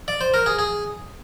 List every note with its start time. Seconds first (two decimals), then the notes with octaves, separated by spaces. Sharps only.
0.08 D5
0.21 C5
0.34 A#4
0.46 G#4
0.59 G#4